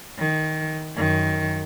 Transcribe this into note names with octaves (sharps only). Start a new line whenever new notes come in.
D#3
F#2 D#3